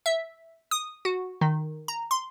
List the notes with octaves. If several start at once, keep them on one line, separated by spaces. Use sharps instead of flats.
E5
D#6
F#4
D#3
A#5
C6